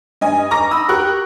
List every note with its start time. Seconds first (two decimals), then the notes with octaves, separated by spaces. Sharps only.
0.21 G2 D#5 G#5
0.51 A#5 C#6 D6 A#6
0.71 B5 D#6 E6
0.88 F#4 G4 A#4 C#6 F#6